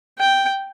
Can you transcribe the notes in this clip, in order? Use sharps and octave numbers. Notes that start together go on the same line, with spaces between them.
G5